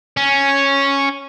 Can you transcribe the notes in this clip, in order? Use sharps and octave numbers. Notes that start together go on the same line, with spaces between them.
C#4